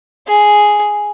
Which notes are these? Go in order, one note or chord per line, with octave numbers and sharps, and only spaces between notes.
G#4